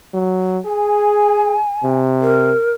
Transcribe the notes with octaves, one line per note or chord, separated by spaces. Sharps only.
F#3
G#4 G#5
C3
A#4